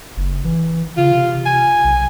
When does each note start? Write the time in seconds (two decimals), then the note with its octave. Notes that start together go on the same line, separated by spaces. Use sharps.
0.17 F#1
0.44 E3
0.97 C#3 F4
1.12 C3
1.46 G#5
1.84 B1